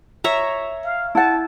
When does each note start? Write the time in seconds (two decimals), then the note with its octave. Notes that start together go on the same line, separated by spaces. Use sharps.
0.24 C#5 E5 A#5
0.84 F5
1.15 E4 F#5 A5